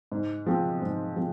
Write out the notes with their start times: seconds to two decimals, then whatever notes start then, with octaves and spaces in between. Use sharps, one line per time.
0.12 G#2
0.46 F3 G#3 C4
0.82 G#2
1.16 F3 G#3 C4